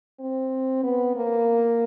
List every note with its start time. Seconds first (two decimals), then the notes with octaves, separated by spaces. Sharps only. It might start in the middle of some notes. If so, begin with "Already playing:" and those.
0.20 C4
0.83 B3
1.16 A#3